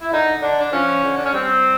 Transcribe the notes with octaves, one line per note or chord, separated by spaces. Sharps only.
E4
D3 D#4
D3 D4
D4
F3 C#4
D3
D4
C#4
G3 C4